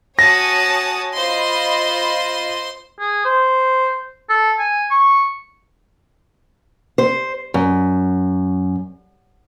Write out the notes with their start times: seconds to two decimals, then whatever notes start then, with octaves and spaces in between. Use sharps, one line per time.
0.19 F#4 C#5 G#5 A5 D#6 A#6
1.14 F4 C5 D#5 B5 C6
3.00 G#4
3.25 C5
4.30 A4
4.59 G#5
4.91 C#6
6.98 C5
7.54 F#2